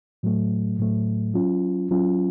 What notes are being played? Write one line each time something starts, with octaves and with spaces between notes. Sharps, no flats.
A2 F#3 A3
A2 F#3 A3
F#3 C#4 F4
F#3 C#4 F4